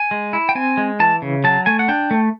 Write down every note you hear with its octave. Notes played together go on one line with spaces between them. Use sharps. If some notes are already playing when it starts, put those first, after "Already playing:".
Already playing: G#5
G#3
E4
G5
C4 G#5
G#3
E3 A5
C#3
F#3 A5
A3 G#5
F#5
D4 G5
A3